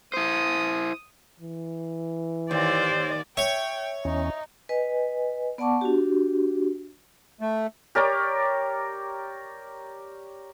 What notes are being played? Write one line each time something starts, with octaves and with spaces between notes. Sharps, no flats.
E4 C5 D#6
E3
D#2 C5 D5
C#5 E5 G5
E2 C#4 D#4
B4 D#5 G#5
B3 D5 F#5 A5 C#6 D6
D4 F#4 G4
A3
G4 A#4 C#5 D5